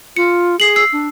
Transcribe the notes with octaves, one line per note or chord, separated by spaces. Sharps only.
F4 C#7
G#4 C7 F#7
E6 C7
D4